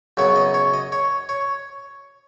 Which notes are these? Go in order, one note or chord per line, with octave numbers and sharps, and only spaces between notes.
F#2 C#3 F#3 B3 C#5
D#5
C#5
D#5
C#5
C#5